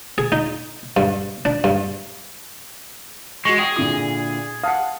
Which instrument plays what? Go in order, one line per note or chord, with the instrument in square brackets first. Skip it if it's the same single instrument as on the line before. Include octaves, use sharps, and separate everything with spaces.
[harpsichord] G#4
D#4
G2
D4
G2
[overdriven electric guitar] G#3 [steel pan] F#4 C#6
[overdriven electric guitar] G#4 [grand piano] G5 D#6 C7
[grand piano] A#2 D3 E4 [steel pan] D#6
[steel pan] F5 F#5 [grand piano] A5 D#6